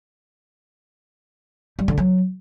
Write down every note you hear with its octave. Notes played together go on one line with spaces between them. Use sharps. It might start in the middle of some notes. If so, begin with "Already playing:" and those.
G3
D3
F#3